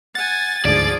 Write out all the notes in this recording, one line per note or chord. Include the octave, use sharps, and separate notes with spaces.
F#5 G#5 A6
D2 G#2 D3 F3 G#4 D5